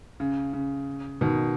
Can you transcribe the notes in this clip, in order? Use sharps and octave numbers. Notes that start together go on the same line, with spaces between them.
C#3
C#3
B2 D#3